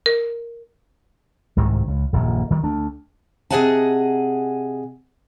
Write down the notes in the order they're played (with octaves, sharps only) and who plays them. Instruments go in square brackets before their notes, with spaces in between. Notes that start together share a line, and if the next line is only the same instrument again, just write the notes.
[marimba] A#4
[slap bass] C2 G#2 C3 D#3
C#2
D#1 A#1 F#2 A#2
D#3 G3
D2 A3 D4
[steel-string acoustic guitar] C3 G#4 D#5 F#5 G#5 A5